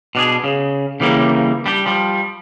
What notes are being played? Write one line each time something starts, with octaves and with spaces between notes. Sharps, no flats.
B2 D4 G#4
C#3
C#3 E3 G3 A3 A#3
G3 D4 G4
F3 G3